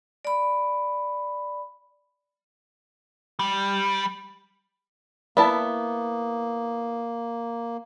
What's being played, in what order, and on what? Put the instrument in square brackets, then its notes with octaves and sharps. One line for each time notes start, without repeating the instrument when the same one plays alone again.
[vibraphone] D5 B5
[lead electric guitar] G3
[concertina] A#3 [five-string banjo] B3 E4 A5